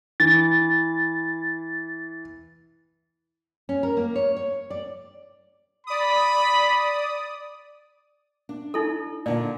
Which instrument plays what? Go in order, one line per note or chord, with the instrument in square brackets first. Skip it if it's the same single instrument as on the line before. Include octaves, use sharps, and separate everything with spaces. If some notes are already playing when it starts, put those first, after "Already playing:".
[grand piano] E3 [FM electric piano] A6
[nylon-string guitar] C#4
A#4
A#3
C#5
C#5
D5
[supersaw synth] D5 D#6 [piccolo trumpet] B5
[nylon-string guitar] D4
[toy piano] D#4 E4 A4
[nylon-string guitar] A#2 D3 [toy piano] D5